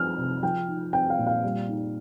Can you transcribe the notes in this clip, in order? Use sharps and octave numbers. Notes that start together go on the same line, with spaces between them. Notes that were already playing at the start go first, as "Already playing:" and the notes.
Already playing: F3 C4 D#4 F6
C3
F3 G5
D#4
C4 G5
F5
A#2
F5
G3
D#4